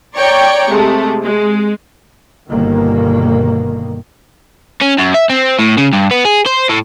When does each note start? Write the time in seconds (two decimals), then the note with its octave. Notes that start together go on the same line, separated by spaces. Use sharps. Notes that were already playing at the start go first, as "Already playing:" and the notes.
0.16 C#5 D5 G5 A#5 C#6
0.72 C3 G#3 A3
1.23 G#3
2.50 G1 B2 D#3 A#3
4.81 C#4
4.98 F#2
5.14 E5
5.29 C4
5.59 A2
5.78 C#3
5.93 G2
6.11 B3
6.25 G#4
6.46 C5
6.69 A2